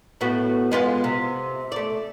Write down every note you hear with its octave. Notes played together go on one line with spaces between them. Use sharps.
A2 B3 F#4
G#3 B3 F4
C3
A3 D5